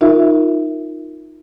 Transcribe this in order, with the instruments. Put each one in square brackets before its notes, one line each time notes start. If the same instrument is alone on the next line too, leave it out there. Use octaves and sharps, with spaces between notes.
[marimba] D#4 F4 A#4 E5